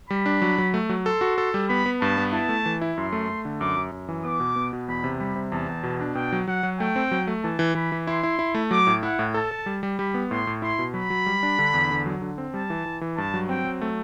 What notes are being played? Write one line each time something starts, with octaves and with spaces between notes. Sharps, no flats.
G3 B5
D4
F#3
F#3
A3
F#3
A4 C6
F#4
A4
G3
B3 B5
B3
G2 A5
B3
E4 A5
A3
E3
E4
F#2 C6
A3
A3
D3
F#2 D6
F#2
F#2
E3
B3 D6
B2
B3
B2
E2 B5
C3
G3 B5
C3
E2 A5
E2
B2
D4
B2 G5
F#3
F#3 F#5
F#3
A3 G5
C4
F#3
A3
E3 A5
E3
E3 B5
E3
E4 C6
E4
E4
A3
F#3 D6
A2
E4 F#5
A2
A4 A5
A4
G3
G3
G3 B5
B3
A2 C6
A2
E4 C6
B2
F#3 B5
F#3
G3
D4
D3
E2
D3
F#3
D3
C4
G3 A5
E3
E3
E3
G2 A5
F#3
C4 G5
F#3
A3